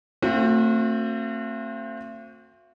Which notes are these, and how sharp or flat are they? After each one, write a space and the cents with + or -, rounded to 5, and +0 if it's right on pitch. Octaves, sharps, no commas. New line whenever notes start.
A3 +40 C4 +20 F#4 -30